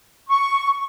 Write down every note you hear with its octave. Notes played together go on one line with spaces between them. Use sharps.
C#6